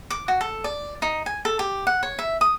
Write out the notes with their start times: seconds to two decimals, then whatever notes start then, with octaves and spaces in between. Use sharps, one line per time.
0.10 D6
0.28 F#4
0.41 A4
0.64 D5
1.02 D#4
1.26 G#5
1.45 A4
1.59 G4
1.87 F#5
2.03 C#5
2.19 E5
2.41 D#6